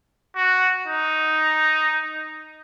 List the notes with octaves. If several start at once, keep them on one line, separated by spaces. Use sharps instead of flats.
F#4
D#4